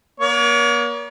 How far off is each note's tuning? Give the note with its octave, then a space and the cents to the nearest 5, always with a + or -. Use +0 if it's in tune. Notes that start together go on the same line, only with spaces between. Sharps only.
A#3 +40 C#5 +45